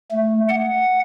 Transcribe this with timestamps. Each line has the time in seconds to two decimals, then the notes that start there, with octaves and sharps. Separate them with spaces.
0.11 A3
0.49 F#5